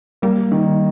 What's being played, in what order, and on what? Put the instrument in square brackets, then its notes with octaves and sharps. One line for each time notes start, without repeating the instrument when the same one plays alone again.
[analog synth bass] G3 [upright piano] A#3
[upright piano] D#3